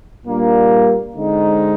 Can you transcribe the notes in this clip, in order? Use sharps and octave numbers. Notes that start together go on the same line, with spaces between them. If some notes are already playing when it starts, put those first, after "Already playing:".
A#2 G3 A#3 D4
D3 G#3 C4 D#4